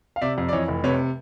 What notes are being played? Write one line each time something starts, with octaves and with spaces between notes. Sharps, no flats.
F5
C3 D5 E5
F2
D5
E3 C#5 D#5
F1
C3 B4 C#5